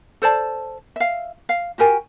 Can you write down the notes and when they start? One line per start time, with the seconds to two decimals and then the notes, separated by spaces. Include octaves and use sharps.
0.22 A4 C5 D5 A5
0.96 E5 F5
1.49 F5
1.78 F#4 G4 A#4 G#5